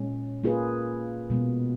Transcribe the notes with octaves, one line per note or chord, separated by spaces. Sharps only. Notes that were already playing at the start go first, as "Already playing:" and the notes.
Already playing: A#2 G#3 C#4
A#3 F4 G#4 B4
B2 G#3 B3